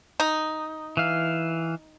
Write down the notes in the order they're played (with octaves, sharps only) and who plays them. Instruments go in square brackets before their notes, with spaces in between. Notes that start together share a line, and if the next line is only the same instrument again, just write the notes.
[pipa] D#4
[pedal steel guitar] E3 F5